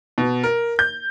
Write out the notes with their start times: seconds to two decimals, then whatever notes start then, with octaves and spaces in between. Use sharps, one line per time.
0.18 B2
0.43 A#4
0.79 G6